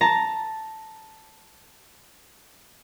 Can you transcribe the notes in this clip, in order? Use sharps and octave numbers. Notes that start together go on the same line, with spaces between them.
A5 A#5